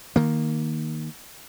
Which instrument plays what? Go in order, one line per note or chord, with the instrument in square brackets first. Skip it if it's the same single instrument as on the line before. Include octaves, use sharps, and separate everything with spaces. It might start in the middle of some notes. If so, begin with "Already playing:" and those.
[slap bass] D#3 A#3